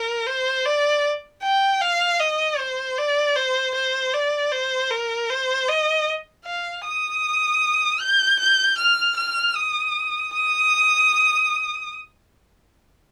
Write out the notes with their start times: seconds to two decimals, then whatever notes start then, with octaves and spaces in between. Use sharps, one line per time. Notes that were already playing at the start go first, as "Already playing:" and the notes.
Already playing: A#4
0.27 C5
0.65 D5
1.43 G5
1.81 F5
2.20 D#5
2.59 C5
2.98 D5
3.36 C5
3.75 C5
4.14 D5
4.52 C5
4.90 A#4
5.30 C5
5.68 D#5
6.45 F5
6.84 D#6
8.00 G6
8.39 G6
8.78 F6
9.17 F6
9.55 D#6
10.33 D#6